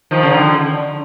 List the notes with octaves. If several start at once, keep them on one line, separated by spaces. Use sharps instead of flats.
D#3 F3
C#3
D3